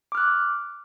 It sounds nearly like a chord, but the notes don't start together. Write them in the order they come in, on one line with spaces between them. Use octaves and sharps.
D6 F6 F#6